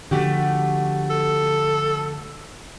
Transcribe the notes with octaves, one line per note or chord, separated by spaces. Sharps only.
D3 F3 A3 F#4 G4
A4